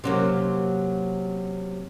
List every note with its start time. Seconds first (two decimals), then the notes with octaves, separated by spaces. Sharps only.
0.04 C3 F#3 A#3 C#4